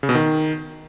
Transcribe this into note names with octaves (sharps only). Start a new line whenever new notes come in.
C#3
B2
D#3